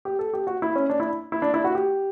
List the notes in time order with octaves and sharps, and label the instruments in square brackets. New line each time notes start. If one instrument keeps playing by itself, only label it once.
[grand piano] G4
A4
G4
F#4
E4
C#4
D4
E4
E4
D4
E4
F#4
G4